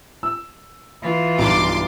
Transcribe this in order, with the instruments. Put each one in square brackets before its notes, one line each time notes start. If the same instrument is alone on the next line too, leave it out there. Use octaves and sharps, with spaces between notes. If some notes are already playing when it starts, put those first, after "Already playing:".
[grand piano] E6
[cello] E3 F4
[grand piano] B1 G2 [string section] C6 D6